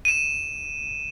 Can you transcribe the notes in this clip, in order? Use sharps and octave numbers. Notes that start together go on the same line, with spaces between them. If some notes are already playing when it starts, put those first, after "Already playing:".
D#7 E7